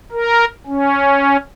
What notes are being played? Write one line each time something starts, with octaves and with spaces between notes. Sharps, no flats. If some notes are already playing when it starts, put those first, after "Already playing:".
A#4
C#4